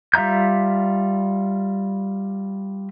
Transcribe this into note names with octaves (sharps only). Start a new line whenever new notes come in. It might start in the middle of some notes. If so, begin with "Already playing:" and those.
G3 F4 E5 A#5 G6